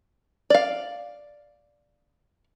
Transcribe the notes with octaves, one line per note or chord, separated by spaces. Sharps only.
D5 F5